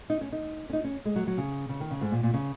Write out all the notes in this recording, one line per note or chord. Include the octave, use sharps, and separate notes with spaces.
D#4
C#4
D#4
C#4
D#4
C#4
G#3
F#3
F#3
C#3
C#3
D#3
C#3
G#2
A#2
A#2
C#3